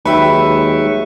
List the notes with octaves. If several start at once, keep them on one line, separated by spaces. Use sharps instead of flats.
D#2 F#3 G#3 B4 E5 G5 C#6